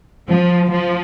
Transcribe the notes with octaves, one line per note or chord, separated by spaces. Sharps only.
F3
F3